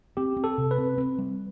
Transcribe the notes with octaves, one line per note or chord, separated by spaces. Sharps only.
C4 G4
C4
A4
C3
B4
C4
C4
G3